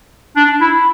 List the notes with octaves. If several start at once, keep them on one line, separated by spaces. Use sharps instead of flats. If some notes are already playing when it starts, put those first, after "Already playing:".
D4
E4